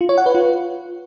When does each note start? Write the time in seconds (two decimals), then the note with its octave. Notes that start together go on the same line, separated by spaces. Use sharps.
0.01 F4
0.09 C#5
0.18 F#5
0.26 B4
0.35 F4